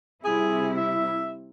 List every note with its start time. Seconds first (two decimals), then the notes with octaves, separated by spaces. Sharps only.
0.25 C3 G3 E4 G#4
0.77 E5